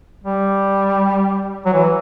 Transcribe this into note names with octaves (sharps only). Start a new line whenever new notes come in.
G3
F#3
E3